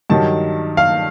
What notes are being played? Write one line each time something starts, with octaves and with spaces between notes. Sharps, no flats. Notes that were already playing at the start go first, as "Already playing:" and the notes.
G2 D#3 F#3 A5
F5